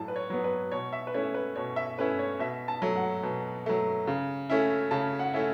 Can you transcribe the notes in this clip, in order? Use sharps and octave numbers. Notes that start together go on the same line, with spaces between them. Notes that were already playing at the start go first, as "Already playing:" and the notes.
Already playing: A2 F#3 A5
B4
C#5
F#3 B3
B4
B2 C#5
E5
B4
A3 C#4 E4 C#5
B4
B2 C#5
E5
A3 C#4 E4 B4
C#5
B2 E5
A5
F#3 A3
F#5
B2
F#3 A3
C#3
A3 C#4 E4
C#3 A5
F#5
A3 C#4 E4